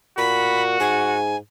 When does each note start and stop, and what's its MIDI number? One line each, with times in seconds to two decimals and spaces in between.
0.18 0.76 46
0.18 1.17 66
0.18 0.62 83
0.80 1.36 44
0.80 1.36 80